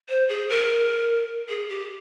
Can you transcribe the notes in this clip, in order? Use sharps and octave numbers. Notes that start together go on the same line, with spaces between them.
C5
G#4
A#4
G#4
G4